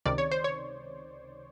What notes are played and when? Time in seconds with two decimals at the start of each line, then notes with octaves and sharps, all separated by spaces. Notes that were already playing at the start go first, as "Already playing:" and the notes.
0.05 C#2 C3 D#3 D5
0.18 C#5
0.31 C5
0.44 C#5